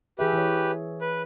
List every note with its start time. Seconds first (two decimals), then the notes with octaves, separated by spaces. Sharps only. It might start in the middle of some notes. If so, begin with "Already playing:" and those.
0.19 E3 G4 G#4 B4 E5
0.33 E3 C#5
1.01 B4